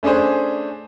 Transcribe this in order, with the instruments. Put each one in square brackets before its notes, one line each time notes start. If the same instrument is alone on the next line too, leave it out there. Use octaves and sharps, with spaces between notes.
[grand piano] A3 C#4 D4 G#4 C5